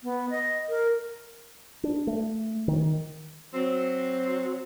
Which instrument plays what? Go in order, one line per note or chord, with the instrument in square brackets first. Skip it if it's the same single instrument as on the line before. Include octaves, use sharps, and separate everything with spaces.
[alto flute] B3
D#5
A#4
[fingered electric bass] D4
A3
D#3
[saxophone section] F#3 C4